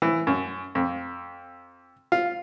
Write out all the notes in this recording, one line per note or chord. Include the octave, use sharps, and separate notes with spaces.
E3
F#2
F2
F4